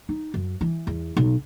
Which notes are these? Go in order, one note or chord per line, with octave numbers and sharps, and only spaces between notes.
D#4
F#2
E3
E2
B1